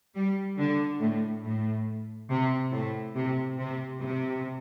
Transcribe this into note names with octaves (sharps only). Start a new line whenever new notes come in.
G3
D3
A2
A2
C3
A2
C3
C3
C3